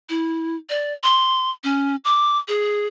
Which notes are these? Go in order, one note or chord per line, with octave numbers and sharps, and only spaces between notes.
E4
D5
C6
C#4
D6
G#4